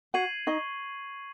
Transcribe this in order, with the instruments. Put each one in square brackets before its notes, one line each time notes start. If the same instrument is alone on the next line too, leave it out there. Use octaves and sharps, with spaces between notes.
[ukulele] F#4 F#5 [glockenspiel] G#6 C7 D#7 F#7
[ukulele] D#4 D#5 [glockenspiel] C#6